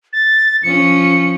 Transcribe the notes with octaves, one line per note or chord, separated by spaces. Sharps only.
A6
F3 C#4 C#7